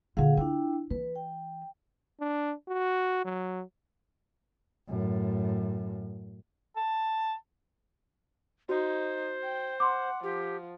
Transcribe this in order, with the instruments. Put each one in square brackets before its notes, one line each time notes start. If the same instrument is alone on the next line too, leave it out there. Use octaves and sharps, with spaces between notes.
[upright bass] A#2 D3 [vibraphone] G#4 F5 F#5
[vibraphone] D4 E4 G5 [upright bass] F4
[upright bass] E3 [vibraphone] B4
[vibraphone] G5
[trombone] D4
F#4
F#3
[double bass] F#2 A2
[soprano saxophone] A5
[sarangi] D#4 [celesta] F#4 [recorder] C5
[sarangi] G5
[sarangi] F#5 [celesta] C6 D6
[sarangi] F3 [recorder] G4